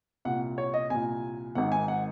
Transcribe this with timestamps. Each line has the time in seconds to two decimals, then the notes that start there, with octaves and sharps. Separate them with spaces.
0.25 C2 A#2 F#5
0.58 C#5
0.74 D#5
0.90 C2 A#2 G#5
1.55 G#1 G#2 D#3 F#5
1.72 G#5
1.88 F#5